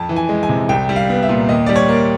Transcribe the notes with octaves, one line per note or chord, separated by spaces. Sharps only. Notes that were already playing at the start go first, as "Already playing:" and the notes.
Already playing: F2 A5
E3
G#5
G#3
G#5
C3
C2 G5
G3
F5
B3
E5
A#2
D#2 D#5
G3 D5
C#5
A#3